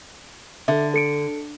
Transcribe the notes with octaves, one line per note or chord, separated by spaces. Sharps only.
D3 A4 E5
A4 C#7 D7